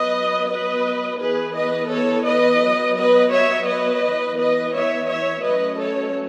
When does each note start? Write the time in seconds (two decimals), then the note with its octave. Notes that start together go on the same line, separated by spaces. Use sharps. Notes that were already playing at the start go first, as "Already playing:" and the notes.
Already playing: F#3 B3 B4 D#5
0.49 B4 D#5
1.19 E3 B3 G#4 B4
1.55 B4 D#5
1.90 A4 C#5
2.26 B4 D#5
2.61 F#3 B3
2.96 B4 D#5
3.32 C#5 E5
3.67 B4 D#5
4.03 E3 B3
4.38 B4 D#5
4.73 C#5 E5
5.08 C#5 E5
5.43 F#3 A3 C#4 B4 D#5
5.79 A4 C#5